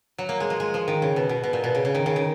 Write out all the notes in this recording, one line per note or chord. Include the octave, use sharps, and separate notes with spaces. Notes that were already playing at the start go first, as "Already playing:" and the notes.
F#3
A#3
G#3
F3
G#3
F3
D#3
C#3
B2
B2
B2
A#2
B2
C#3
C#3
D#3
C#3
D#3